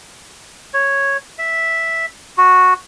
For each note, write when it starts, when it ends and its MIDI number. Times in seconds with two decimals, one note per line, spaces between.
0.74 1.17 73
1.38 2.06 76
2.38 2.74 66